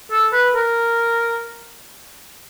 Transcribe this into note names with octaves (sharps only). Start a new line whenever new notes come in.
A4
B4
A#4